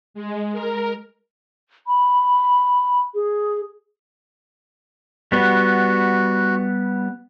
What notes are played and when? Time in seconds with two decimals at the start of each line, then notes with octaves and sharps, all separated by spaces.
0.14 G#3
0.53 A#4
1.87 B5
3.14 G#4
5.32 G3 B3 F#4